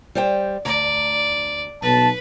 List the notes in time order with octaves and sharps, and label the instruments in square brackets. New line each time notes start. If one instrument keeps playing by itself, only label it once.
[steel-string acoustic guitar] G3 C5 G5
[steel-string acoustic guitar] D2 A#5 [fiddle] D5
[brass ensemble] B1 A5 [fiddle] B4